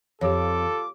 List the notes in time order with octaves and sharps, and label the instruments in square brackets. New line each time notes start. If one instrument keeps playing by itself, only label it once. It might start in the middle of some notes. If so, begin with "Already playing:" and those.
[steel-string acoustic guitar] F2 [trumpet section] F4 D6 [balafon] G4 C#5 [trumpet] A4